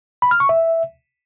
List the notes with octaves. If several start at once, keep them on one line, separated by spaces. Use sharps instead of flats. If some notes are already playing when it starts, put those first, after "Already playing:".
B5
F6
C#6
E5